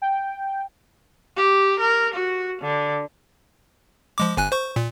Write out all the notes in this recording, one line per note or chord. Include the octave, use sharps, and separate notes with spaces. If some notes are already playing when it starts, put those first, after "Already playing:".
G5
G4
A#4
F#4
D3
F3 G#3 D6
G1 G#5 F#6
C5 C#6
A#2